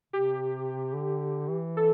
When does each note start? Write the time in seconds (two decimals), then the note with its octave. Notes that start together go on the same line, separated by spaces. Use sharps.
0.13 C3 G4
0.95 D3
1.49 E3
1.77 A4